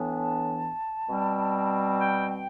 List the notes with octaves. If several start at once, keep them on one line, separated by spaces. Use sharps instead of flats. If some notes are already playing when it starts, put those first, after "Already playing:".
Already playing: A2 E3 B3 D4
A5
B2 G3 C4
G5
G5